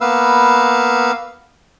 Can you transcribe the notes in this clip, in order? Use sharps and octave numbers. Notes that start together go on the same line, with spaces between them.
A#3 B3 B4 F5 E6